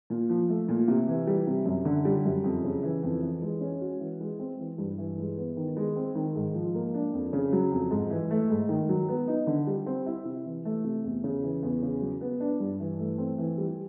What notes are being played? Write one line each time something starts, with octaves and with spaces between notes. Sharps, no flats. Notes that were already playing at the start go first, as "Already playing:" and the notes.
A#2
F3
A3
A#2
C3
E3
G3
C3
F#2
D3
G3
F#2
F2
C#3
E3
F2
E3
G#3
C#4
F#4
E3
G#3
C4
E3
G2
E3
G#3
B3
D#3
G#3
C4
D#3
G#2
F3
A#3
D4
F2
C#3
F#3
F2
G#2
E3
A3
G#2
D#3
F#3
B3
D#4
D3
G3
C4
E4
C3
E3
A3
C3
E2
C#3
E3
E2
C#3
F#3
B3
D4
G2
E3
A3
C4
E3
G3